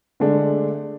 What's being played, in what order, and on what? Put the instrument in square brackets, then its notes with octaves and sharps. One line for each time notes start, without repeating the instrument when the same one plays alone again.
[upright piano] D3 G#3 A3 D4